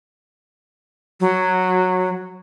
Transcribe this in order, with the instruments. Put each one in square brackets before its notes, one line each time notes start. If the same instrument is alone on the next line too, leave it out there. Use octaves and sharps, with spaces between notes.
[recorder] F#3